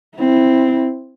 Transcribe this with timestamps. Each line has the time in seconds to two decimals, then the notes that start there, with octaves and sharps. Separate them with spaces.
0.18 C4 E4